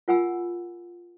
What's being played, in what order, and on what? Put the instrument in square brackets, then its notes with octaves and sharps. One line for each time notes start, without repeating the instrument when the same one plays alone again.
[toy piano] F4 A#4 F#5 G#5 B5 E6